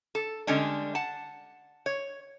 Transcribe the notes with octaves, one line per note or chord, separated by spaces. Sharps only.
A4
D3 G3 G#3 C#4 D4
F#5 A5
C#5